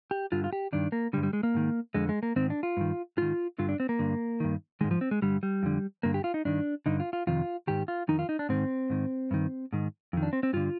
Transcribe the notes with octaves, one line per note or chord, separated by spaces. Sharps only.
G4
G2 D3 F4
F4
G4
G2 D#3 D4
A#3
G2 D3 G3
G3
G#3
A#3
G#2 D#3
F2 D3 G#3
G#3
A#3
G#2 D#3 C4
D4
F4
G2 D#3
G#2 D#3 F4
G2 D3 F4
D4
C4
A#3
G2 D3
G2 D#3
G#2 D#3 G#3
F3
C4
G#3
G2 D3 G3
G3
F2 D3
G2 D3 A#3
G4
F4
D#4
G2 D#3 D4
G2 D3 D#4
F4
F4
F2 C3 D#3 F4
G#2 D#3 G4
F4
F2 D#3 D#4
F4
D#4
D4
G#2 D#3 C4
G#2 D#3
G2 D#3
G#2 D#3
F2 D#3
D4
C4
C4
G2 D3 F4